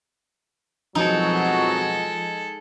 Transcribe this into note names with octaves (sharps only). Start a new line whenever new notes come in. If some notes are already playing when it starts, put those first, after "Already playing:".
F2 B2 F3 F#3 G#3 D#4 A4